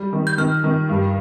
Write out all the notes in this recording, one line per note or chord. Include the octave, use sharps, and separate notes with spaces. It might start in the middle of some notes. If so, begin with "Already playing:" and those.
Already playing: G3
D#3
G6
D#3 F6
D#3
G2